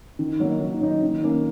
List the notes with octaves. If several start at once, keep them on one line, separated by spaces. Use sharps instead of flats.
D#3
F#3 A#3 D#4
D#3
F#3 A#3 D#4
D#3
A#3 C#4